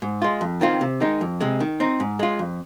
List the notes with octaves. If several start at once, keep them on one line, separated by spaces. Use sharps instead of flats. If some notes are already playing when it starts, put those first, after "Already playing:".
G#2
G#3 F4
F2
D#3 C4 F4
C3
D#3 G#3 D#4
F2
C3 G#3
D#3
C4 D#4
G#2
G#3 F4
F2